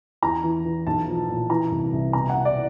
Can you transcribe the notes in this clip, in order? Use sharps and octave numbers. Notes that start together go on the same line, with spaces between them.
E2 A#5
E3
E3
B1 A5
F3
A#2
E3 A#5
C2
C2
B2 A#5
F#5
B2
D5